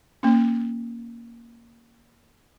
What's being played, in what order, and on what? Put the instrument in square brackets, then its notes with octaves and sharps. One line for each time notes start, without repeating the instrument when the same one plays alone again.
[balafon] A#3 C#4